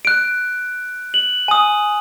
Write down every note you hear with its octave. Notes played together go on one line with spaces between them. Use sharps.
F#6 D7
F#7
G#5 D#6